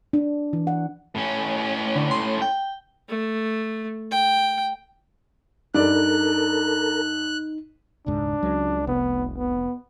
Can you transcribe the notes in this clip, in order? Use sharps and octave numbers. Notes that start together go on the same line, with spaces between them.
D4
E3
F#5
A2 C#4
D3
C6
G5
A3
G5
G2 D#4 A4 A#4 D5 F#6
E1 C#2 G#2 D4
C#2 F#3
F1 C2 B3
B3